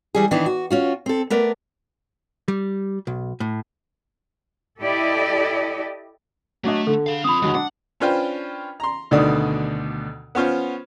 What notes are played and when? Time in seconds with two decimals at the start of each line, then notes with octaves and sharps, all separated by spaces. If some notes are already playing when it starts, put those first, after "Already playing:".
0.15 E3 G3 G#4
0.31 D#3 E3 B3 D4
0.46 F#4
0.70 C#4 F4 F#4
1.06 C4 A4
1.30 A3 B3 A#4 D5
2.48 G3
3.07 B1
3.40 A2
4.82 E4 G4 A4 D5 D#5
6.64 F#3 A3 D4 D#5
6.87 D3 A4
7.06 G#4 F5
7.24 C4 F4 B5 D#6
7.42 D#2 D3 F#3 G#3
7.55 D4 F#5
8.00 C#4 D4 F4 B4 C5 G5
8.80 A#5 C6
9.11 D2 B2 D3 D#3 D5 D#6
10.35 B3 C#4 F4 C5